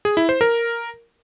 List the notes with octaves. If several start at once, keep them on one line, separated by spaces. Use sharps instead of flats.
G#4
E4
C5
A#4